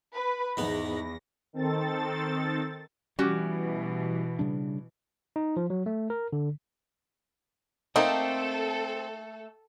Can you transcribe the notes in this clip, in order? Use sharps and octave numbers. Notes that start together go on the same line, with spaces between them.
B4
E2 G#2 B3 A#6
D#3 C4 A4 A6
B2 E3 G3 C#4 F#4 G4
C#3 G3 D4
D#4
F3
F#3
A3
A#4
D3
A3 A#3 C4 D#4 A4